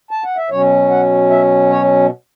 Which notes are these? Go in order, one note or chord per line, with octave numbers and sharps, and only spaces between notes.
A5
F#5
E5
B2 F#3 C#4 C#5
F#5
E5
C#5